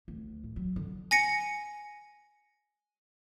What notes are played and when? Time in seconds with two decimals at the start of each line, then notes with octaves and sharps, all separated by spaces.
0.08 D2
0.44 A2
0.56 F#3
0.76 D3
1.11 G#5 A#6 C#7